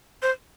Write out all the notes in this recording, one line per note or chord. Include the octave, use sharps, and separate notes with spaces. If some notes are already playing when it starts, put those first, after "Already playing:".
C5